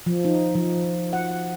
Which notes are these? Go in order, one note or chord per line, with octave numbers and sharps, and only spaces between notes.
F3
D#4
F3
F#5